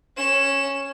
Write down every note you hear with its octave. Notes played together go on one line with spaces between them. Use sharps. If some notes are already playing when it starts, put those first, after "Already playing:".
C#4 E7